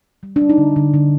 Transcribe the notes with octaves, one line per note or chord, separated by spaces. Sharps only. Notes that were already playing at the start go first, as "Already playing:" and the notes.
G3
D4
G3
D#4
D3
D3
D3